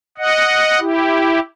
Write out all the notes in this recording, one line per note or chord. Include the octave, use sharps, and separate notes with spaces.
D#5 F#5
E4 G4